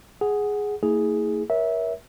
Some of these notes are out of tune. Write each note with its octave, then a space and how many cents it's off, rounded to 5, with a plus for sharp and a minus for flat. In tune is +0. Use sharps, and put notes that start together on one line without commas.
G#4 +0 F#5 +0
A#3 -45 E4 -35 G#4 +0
A#4 +30 C#5 +0 E5 -15